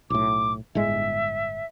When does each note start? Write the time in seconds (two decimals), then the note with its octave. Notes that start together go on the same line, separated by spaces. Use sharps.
0.10 B1 A2 D6
0.75 G1 A2 G#3 E5